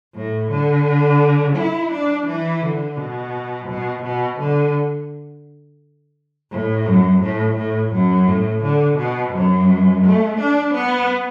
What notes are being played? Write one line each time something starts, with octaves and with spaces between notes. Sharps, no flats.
A2
D3
E4
D4
E3
D3
B2
B2
B2
D3
A2
F#2
A2
A2
F#2
A2
D3
B2
F#2
A3
D4
B3